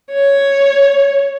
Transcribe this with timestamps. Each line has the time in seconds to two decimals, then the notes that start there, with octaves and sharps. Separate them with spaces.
0.12 C#5